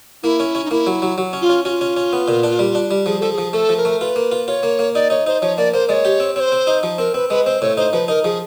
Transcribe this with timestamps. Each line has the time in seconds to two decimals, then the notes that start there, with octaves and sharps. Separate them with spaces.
0.23 A#3 E4
0.40 C#4
0.55 C#4
0.65 D#4
0.71 A#3 E4
0.87 F#3
1.02 F#3
1.18 F#3
1.33 C#4
1.41 F4
1.49 C#4
1.65 C#4 F4 F#4
1.81 C#4
1.96 C#4
2.13 B3
2.28 A#2
2.44 D4
2.59 G3
2.75 D4
2.91 G3
3.06 F3 G#4
3.20 F3 A4
3.33 G#4
3.38 F3
3.53 A3 A4
3.69 F3
3.77 A#4
3.85 A3
4.00 F4 B4
4.16 A#3
4.32 F4
4.47 F4 C#5
4.63 A#3
4.79 A#3
4.94 D#4 D5
5.10 D#4 C#5
5.27 D#4 C5
5.41 F3 C#5
5.57 A#3 D5
5.73 A#3 C5
5.89 G#3 C#5 D5
6.05 G4
6.20 C4
6.36 C4 C5 C#5
6.52 C4
6.67 D#4
6.83 F3
6.98 C4 A#4
7.14 C4 B4
7.30 G#3 B4
7.45 C4 C5
7.62 A2 C#5
7.77 D#4 C5
7.93 F3 B4
8.08 D#4 A#4
8.24 F3 G#4